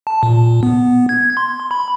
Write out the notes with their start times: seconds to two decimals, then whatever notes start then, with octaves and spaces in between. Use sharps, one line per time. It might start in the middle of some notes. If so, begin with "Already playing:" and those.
0.07 A5
0.23 A#2
0.63 B3
1.09 G#6
1.37 C6
1.71 B5